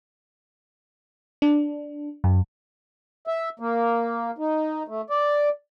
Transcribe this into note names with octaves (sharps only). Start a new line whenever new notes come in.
D4
F#2
E5
A#3
D#4
A3
D5